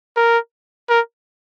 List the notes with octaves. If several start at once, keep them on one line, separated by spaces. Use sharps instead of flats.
A#4
A#4